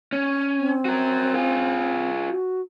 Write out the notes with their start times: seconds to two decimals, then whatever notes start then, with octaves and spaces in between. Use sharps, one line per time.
0.13 C#4
0.59 C4
0.85 F#4 A#4
1.34 F4 G#4
2.29 F#4